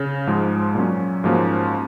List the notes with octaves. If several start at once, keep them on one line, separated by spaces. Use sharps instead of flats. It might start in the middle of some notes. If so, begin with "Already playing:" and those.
Already playing: C#3 C#4
G#2 F3 G#3
A#2 F#3 C#4
G#2 F3 A#3 C#4 F#4